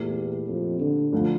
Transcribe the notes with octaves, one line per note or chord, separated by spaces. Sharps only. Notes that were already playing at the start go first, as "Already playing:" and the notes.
Already playing: E2 A#2 A3 E4 G4
F2
D3
D2 D3 F3 C4 F4